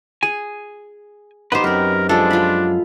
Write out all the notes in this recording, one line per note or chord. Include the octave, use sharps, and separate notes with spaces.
G#4 G#5
B3 D#4 G4 B4 C5
F#2 C4 A#4 B4
F3 G#3 D4 A4
F4 B5